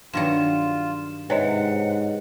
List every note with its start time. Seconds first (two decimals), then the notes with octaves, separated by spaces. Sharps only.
0.13 G2 D#3 F#3 F4 E7
1.30 G#2 C3 B4 C#5 D#5 F#5